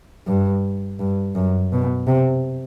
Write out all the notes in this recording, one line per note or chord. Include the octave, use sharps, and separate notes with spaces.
G2
G2
F#2
B2
C3